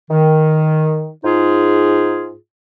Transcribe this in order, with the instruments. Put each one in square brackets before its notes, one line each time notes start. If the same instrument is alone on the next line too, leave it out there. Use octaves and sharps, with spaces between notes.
[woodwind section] D#3
G#2 D#4 F4 G#4